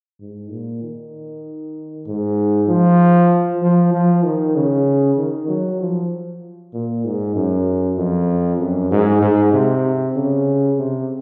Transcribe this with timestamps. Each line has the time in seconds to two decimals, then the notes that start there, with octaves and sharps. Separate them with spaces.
0.20 G#2
0.51 A#2
0.82 D#3
2.07 G#2
2.68 F3
3.62 F3
3.93 F3
4.24 D#3
4.55 C#3
5.18 D#3
5.48 F#3
5.80 F3
6.73 A#2
7.05 G#2
7.36 F#2
7.97 F2
8.59 F#2
8.91 G#2
9.22 G#2
9.53 C3
10.16 C#3
10.78 C3